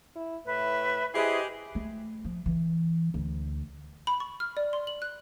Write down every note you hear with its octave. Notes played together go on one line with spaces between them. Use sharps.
E4
A2 B4 E5
E4 G4 G#4 B4 C5 D#5
A3
F3
E3
D2
B5
C#6
F6
D5
C6
F#7
F#6